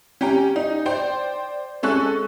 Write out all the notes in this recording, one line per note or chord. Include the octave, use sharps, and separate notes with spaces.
C#4 G4 G5 A#5
D#4
C5 D5 G5
G#3 C#4 A4 C#6 F#6